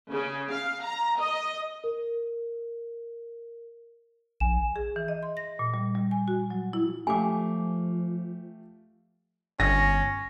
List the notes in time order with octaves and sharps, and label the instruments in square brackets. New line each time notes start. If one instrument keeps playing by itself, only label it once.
[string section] C#3
F5
A#5
D#5
[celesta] A#4
[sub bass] A#1 [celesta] G#5 E7
[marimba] G#4
E3
D#5
C6
A#6
A#2
G3
G3
G#5
F#4
F#3
E4
[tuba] F3 [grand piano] A3 G4 F5 [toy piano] G#5 D6
[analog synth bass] G1 [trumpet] C#4 [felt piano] A#6